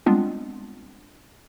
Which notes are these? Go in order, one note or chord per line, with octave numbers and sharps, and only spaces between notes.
G3 G#3 B3 C4 D4 F4